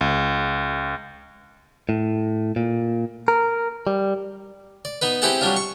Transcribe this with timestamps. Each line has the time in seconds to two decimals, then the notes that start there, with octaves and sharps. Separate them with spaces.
0.01 C#2
1.89 A2
2.56 A#2
3.28 A#4
3.87 G3
4.85 D5
5.02 B3 D#4 B4
5.22 C4 E4 G4 G#4 F#5 A5
5.41 F#3 G3 D4 F4
5.56 C#6